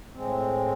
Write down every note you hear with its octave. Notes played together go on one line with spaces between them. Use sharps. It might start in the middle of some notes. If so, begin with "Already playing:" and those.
A2 G#3 C4